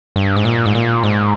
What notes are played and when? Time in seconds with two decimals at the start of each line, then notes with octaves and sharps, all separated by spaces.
0.16 G2
0.36 G#2
0.45 A#2
0.66 G#2
0.75 A#2
1.03 G#2